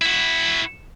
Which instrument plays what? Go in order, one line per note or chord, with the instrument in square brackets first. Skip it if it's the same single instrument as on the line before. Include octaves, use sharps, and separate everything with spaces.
[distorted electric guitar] E4 F#4